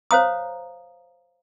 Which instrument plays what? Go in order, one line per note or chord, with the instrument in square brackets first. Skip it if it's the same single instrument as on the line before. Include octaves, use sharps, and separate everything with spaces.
[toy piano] C5 C#5 F5 A#5 D#6